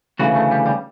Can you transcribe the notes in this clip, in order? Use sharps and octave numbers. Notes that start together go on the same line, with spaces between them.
D2 C#3 E3 F#4
A3
G3
G3